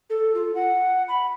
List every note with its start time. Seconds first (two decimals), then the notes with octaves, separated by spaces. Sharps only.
0.10 A4
0.35 F4
0.55 F#5
1.08 B5